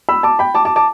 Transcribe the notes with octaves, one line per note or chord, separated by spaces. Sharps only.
B5 E6
A5 D6
G5 B5
A5 D6
A5 D6
A5 D6